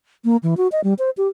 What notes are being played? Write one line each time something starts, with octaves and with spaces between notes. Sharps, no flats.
A#3
E3
F#4
D#5
G3
C5
G4